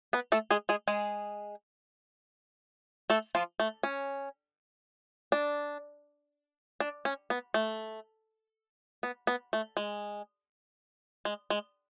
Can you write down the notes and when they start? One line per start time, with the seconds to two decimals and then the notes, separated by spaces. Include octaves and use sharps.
0.13 B3 B4
0.32 A3 A4
0.51 G#3 G#4
0.69 G#3 G#4
0.88 G#3 G#4
3.10 A3 A4
3.35 F3 F4
3.60 A3
3.83 C#4
5.32 D4
6.80 D4
7.05 C#4
7.30 B3
7.54 A3
9.03 B3
9.27 B3
9.53 A3
9.77 G#3
11.25 G#3
11.50 G#3